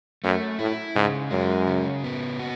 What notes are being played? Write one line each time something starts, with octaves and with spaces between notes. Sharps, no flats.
F#2 A3
A2 E4
G#2 C#3
F#2 G#3
C#3
B3
F#4